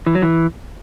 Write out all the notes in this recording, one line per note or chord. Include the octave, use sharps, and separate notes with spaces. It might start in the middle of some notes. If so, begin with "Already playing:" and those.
E3
F#3
E3